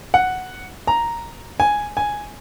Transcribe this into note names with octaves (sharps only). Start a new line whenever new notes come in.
F#5
A#5
G#5
G#5